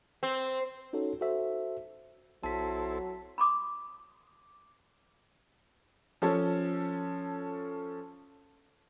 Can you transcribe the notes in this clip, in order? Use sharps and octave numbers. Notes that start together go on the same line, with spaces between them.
C4
C#4 D#4 F#4 A4 C#5
F#4 A4 C5 E5
B1 F#3 C4 E4 A4 A5 B6
B5 C6 D6 D#6
F3 C#4 A4 C#5